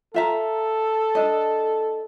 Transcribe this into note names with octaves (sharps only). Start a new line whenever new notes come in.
F4 A4 E5 A#5
D4 D#5